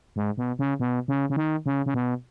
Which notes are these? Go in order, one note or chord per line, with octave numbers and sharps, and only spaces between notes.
G#2
B2
C#3
B2
C#3
C#3
D#3
C#3
C#3
B2